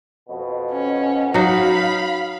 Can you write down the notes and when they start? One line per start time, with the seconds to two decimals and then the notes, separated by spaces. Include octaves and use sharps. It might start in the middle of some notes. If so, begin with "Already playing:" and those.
0.29 F2 B2
0.72 C#4
1.34 F#3 D#4 F5 B5